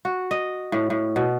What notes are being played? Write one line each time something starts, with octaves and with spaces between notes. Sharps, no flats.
F#4
D#5
A2
A2
B2